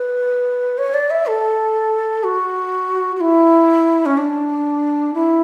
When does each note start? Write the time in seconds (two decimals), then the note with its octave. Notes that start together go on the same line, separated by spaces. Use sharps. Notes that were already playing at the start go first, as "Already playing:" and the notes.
Already playing: B4
0.78 C#5
0.94 D5
1.10 E5
1.27 A4
2.24 F#4
3.16 F#4
3.21 E4
4.06 C#4
4.18 D4
5.14 E4